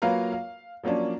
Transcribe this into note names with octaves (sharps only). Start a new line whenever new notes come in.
F#3 A#3 F4 B4 F5 A#5
F5
F3 F#3 A#3 C#4 D4